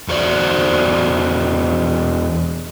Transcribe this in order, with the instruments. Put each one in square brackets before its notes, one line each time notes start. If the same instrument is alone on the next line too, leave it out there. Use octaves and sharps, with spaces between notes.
[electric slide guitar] E2 F#4 C5 D5